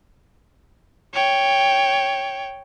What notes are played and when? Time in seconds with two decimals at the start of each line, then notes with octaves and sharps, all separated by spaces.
1.13 C#5 G5